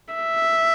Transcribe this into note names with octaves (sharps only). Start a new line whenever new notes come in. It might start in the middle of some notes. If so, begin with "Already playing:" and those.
E5